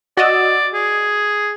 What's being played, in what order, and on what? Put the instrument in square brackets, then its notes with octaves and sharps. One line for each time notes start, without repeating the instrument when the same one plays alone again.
[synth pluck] F#4 D#5 E6 [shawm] D5
[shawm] G#4